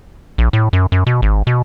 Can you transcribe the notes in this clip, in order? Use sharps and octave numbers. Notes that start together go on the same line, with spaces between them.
A#1
A2
F#2
F#2
B2
G#1
B2